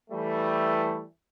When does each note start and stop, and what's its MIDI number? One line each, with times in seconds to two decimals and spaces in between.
0.11 1.03 52
0.11 1.03 55
0.11 1.03 57